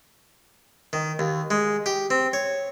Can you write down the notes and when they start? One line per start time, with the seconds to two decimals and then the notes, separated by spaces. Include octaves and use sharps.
0.93 D#3
1.19 D#2
1.51 G#3
1.86 G4
2.10 C4
2.33 C#5